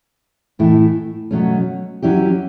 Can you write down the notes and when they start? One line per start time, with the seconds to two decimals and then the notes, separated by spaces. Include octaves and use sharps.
0.59 A2 E3 A3 E4
1.31 B2 F#3 A3 C#4
2.02 F#3 C#4 E4 G4